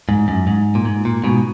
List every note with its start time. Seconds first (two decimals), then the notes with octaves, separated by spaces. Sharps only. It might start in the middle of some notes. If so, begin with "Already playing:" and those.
0.09 G#2
0.28 F#2
0.47 G#2
0.75 A#2
0.85 G#2
1.05 A#2
1.24 G#2 B2